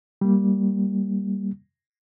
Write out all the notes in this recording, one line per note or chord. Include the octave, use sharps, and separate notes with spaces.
G3 A#3